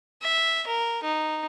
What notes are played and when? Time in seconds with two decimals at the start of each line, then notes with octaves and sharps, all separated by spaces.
0.23 E5
0.67 A#4
1.03 D#4